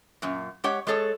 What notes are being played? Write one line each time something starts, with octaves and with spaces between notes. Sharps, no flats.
F#2 A#2
G#3 G4 C#5 F#5
G#3 G#4 A4 C#5